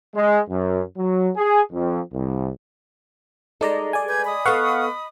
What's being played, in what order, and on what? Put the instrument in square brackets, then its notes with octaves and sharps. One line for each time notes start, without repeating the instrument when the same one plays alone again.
[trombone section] G#3
F#2
F#3
G#4
F2
C2
[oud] G3 G#3 A4 [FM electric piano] D#4 D5 A#5
[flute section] G#4 [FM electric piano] D5 G#5
[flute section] B4 G6 G#6
D#5 B5 D#6
[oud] B3 A4 [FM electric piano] F5 F#5 C#6